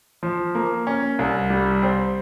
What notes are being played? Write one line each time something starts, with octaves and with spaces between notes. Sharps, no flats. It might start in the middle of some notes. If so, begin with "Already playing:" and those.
F3
A#3
C#4
C2
G3
C4